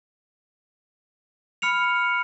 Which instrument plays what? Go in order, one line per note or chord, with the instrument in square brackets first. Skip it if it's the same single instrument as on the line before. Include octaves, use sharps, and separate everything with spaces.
[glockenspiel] B5 F6 C#7 F7